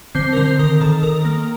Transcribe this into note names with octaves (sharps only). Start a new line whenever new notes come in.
D3 C4 C5
A#4
D3 C4 C5
D#3 A#4
D#3 A4
D#3 A#4
A#3